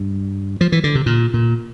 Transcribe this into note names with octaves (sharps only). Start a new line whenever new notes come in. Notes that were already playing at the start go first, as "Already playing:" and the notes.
Already playing: G2
F3
E3
D3
C3
A#2
A#2